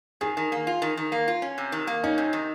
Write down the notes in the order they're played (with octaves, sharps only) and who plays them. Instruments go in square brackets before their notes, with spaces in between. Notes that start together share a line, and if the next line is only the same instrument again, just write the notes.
[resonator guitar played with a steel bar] D#3 [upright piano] G#4
[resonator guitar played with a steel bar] D#3
A#3
F4
D#3
D#3
A#3
F4
C#4
C3
D#3
A#3
[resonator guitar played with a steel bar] C#4 [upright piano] D#4
[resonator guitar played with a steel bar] C3
D#3